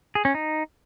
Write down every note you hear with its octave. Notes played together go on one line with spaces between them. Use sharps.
G#4
C#4
D#4